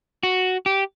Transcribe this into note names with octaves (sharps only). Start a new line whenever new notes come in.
F#4
G4